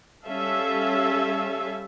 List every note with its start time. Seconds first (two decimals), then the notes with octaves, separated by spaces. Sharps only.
0.25 G3 C#4 A4 E5 F5